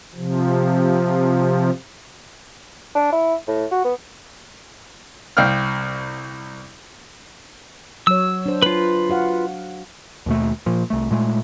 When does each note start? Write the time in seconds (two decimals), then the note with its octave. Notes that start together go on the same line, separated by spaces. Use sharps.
0.15 C3 F3
2.95 D4
3.12 E4
3.48 A2
3.71 F#4
3.84 B3
5.37 C2 F5 G5 F6
8.07 F#3 C#5 E6
8.46 D4 C5
8.62 F4 B4
9.09 F#4 F5 F#5
10.26 D#2 B2 A3
10.66 A#2 F3
10.90 C2 A3
11.10 A#2 G#3 A3